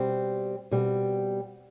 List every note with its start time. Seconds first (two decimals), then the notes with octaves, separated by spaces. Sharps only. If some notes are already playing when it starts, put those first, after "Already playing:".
Already playing: B2 G3 C4
0.71 B2 G3 C4